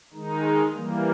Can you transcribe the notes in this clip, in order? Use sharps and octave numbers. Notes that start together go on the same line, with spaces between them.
D#3 G#3 D#4
E3 G3 A#3